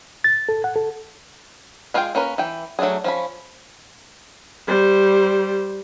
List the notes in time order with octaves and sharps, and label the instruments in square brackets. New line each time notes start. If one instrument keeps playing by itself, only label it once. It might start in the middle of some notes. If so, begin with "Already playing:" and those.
[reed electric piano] A6
A4
F#5
A4
[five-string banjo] G#3 F4 G#4 F5 G5
A#3 C#4 A#4 B4
E3 G5
F#3 A3 C4 D4 G#4
F3 C#4 B5
[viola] G3 C5